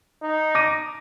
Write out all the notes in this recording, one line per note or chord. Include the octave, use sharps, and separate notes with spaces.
D#4
D6 A#6 D#7